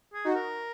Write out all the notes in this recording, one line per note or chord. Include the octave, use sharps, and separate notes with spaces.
G#4
D#4 F#4
A#4